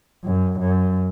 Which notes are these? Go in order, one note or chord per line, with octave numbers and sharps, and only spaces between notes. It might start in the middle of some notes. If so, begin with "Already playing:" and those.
F#2
F#2